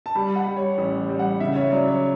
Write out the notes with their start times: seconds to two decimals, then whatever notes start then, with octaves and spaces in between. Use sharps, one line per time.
0.06 A5
0.15 G3 B5
0.36 F#5
0.47 G3
0.56 C#5
0.78 A1
1.09 G3
1.19 F#5
1.40 C#3 E5
1.56 C#5
1.72 F#3 D5
1.88 C#5